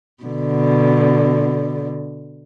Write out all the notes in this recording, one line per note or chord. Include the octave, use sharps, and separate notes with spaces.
B2 D3